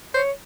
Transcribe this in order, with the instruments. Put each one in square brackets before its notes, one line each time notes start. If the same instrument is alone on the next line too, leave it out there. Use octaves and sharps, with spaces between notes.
[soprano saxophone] C5 [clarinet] C#5